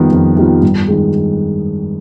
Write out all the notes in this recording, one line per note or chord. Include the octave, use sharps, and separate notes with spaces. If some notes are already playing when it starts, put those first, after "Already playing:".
Already playing: F2 D#3 G3 B3 F4
F2
D#3 G3 B3 F4
G2
D#3 G#3